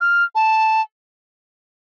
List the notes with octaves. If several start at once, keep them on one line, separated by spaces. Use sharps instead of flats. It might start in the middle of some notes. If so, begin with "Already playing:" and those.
F6
A5